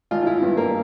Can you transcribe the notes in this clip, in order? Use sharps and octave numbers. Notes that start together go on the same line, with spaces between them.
G#1 F4
F4
E4
G2 B3
A#3